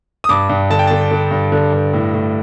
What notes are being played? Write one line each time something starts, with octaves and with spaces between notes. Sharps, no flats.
D#6
G2 D6
G2
D3 A5
G5
D3 A5
D3
G2
D3
G2
A2
A2